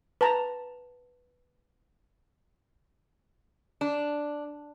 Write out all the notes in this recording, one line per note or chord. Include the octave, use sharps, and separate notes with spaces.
B4 A5 A#5
D4